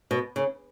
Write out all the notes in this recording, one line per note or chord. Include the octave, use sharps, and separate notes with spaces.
B2
C#3